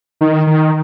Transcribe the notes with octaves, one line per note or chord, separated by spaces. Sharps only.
D#3
D#3